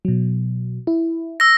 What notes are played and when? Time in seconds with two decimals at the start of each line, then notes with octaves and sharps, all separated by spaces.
0.05 B2 F#3
0.87 E4
1.40 E6 A#6